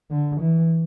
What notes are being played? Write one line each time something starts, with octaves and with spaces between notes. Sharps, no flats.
D3
E3